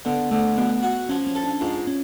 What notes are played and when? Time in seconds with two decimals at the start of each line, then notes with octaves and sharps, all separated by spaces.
0.05 D3 B3
0.31 D3 A3
0.57 B2 B3
0.83 F#4
1.09 F3 C#4
1.27 C#4
1.35 A4
1.44 D4
1.61 G#2 F4
1.87 C#4